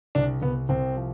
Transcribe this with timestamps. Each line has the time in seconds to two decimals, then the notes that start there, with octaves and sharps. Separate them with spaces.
0.15 C2 D4
0.42 C2 B3
0.69 C2 C4
0.97 F3